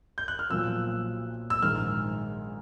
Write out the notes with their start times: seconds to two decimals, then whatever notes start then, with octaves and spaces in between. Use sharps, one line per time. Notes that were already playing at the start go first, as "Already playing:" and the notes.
0.18 G6
0.28 F#6
0.39 F6
0.50 B1 A#2 F3 E6
1.50 E6
1.62 A#1 G#2 D#3 G#3 F6